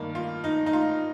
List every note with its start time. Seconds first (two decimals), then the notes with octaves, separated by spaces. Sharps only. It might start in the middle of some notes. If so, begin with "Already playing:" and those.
Already playing: G2 D#3 A#3
0.15 F4
0.44 D#4
0.66 D#4
0.73 F4